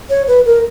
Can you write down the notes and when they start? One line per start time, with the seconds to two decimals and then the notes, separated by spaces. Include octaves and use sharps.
0.10 C#5
0.27 B4
0.46 A#4